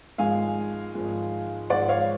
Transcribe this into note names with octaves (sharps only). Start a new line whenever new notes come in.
G#1 G#2 F3 G#3 F5 G#5
G#1 G#2 F3 G#3
G#1 G#2 F3 G#3 D5 F#5
C#5 F5